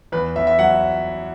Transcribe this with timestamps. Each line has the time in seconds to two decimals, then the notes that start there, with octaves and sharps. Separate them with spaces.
0.12 E2 B4
0.36 E2 E5
0.47 E5
0.59 F#3 F#5